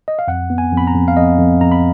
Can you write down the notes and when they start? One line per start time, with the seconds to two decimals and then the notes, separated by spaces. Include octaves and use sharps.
0.08 D#5
0.19 F5
0.28 F2 F#5
0.50 B3
0.58 G#5
0.72 F2
0.77 B5
0.87 A#5
0.95 F2
1.08 F5
1.17 F2 D#5
1.39 F2
1.61 F2 A#5
1.72 B5